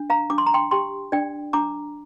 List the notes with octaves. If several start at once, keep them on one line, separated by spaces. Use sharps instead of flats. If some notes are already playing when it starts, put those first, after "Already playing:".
Already playing: D4
F5 A#5
D4 D6
C6
A#5
G5 C6
G4 G5 C6
D4 D5 G5
D4 A#5 D6